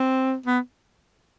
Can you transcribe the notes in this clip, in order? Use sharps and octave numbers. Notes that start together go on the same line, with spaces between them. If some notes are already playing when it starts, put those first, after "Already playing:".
Already playing: C4
B3